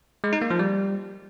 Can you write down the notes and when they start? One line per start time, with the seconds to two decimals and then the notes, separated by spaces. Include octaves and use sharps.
0.24 G#3
0.33 D#4
0.42 A#3
0.50 F3
0.59 G3